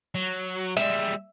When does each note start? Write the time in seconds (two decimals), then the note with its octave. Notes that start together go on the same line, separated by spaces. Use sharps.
0.15 F#3
0.77 G3 G#3 E5